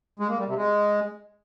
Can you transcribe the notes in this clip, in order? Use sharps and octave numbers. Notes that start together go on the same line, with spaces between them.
G#3
A#3
G3
C3
G#3